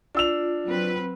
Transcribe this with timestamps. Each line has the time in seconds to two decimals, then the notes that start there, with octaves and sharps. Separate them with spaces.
0.15 D4 F4 E6 F7
0.66 F#3 C4 B4